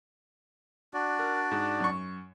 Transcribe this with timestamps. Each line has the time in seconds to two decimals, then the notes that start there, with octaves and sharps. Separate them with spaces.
0.94 D4 F#4 D5
1.19 A#4
1.51 G#2
1.80 F#2 C#6